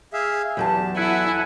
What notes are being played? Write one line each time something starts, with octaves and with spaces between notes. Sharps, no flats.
G#4 E5 F5
E2 F#3 G4 A5
E4 A4 E5 F#5 G#5